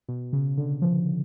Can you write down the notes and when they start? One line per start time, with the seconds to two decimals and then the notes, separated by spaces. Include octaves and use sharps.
0.08 B2
0.33 C#3
0.57 D3
0.82 F3